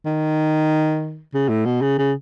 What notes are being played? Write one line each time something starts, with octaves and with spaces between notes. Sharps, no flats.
D#3
C#3
A2
B2
C#3
C#3